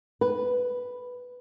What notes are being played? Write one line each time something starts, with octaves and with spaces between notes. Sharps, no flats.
B4